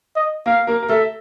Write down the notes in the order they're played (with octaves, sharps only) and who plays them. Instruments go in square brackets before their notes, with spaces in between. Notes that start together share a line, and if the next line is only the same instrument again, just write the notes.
[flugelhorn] D#5
[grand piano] A#3 A#4 [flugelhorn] F5
[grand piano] A#3 A#4
A#4
[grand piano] A3 A4 [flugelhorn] E5